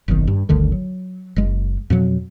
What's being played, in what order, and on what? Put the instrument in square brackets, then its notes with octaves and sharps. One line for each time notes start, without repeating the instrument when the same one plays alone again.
[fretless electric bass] F#1 B1 B2 D#3
G2
G1 D2 D3 D#3
F#3
F#1 G#3
F2 B2 F#3